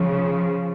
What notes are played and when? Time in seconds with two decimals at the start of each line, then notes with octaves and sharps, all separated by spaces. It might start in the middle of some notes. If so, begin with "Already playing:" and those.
Already playing: C#3 F3